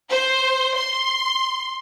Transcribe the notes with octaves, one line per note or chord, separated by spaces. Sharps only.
C5
C6